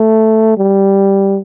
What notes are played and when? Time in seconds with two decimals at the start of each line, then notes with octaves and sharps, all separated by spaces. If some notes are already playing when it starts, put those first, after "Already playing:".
Already playing: A3
0.58 G3